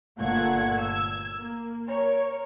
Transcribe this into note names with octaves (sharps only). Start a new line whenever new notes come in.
G1 A#2 A3 F#5 G#6
E6 G#6
A#3
A#4 C#5